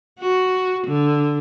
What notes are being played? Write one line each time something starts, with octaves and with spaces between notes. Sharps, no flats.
F#4
D3